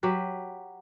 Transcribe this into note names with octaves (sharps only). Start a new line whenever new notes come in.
F#3 G4 B4